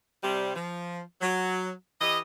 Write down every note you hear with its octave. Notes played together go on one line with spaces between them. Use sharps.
C3 G3
F3
F#3
E3 G4 D#5